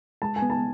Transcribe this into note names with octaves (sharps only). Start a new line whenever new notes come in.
G#3 A5
G#5
B3
A5